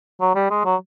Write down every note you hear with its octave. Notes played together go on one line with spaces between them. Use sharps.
F#3
G3
G#3
F#3